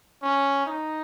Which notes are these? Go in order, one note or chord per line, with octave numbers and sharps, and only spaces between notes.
C#4
D#4